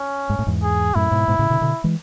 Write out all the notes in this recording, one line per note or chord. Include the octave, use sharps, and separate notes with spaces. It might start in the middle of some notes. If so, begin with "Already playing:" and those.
Already playing: C#4
G#2
A2
E2 G#2
G#4
F#2 A2 E4
G#2 B2
G#2 B2
A2 C#3
B2 D3
B2 D3
E3 G#3